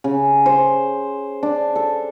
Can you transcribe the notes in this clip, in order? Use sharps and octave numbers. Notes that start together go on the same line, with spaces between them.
C#3
C5
D4
A4